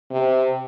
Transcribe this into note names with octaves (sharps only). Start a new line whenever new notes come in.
C3